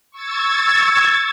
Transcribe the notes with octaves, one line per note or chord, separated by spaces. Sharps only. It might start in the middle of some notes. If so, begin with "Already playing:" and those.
C#6 E6 G#6 A6